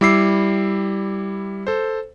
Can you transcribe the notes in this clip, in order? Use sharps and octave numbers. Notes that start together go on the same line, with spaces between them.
G3 E4 D6 E6 C7
A4 C5